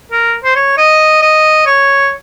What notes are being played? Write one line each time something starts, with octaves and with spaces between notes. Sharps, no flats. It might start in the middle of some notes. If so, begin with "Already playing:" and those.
A#4
C5
C#5
D#5
D#5
C#5